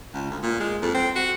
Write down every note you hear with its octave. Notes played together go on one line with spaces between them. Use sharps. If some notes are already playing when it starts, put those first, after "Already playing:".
C#2
D2
A#2
G#3
F2
C4
F#4